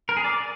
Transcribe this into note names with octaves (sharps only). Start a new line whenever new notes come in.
A#4
G#4
D5